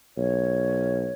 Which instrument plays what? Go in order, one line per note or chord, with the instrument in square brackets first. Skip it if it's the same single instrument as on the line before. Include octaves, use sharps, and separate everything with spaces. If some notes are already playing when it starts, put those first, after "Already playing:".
[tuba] B1 [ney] C#5